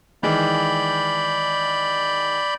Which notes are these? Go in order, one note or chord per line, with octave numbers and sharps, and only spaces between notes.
D#3 E3 G#3 D5 B5 G6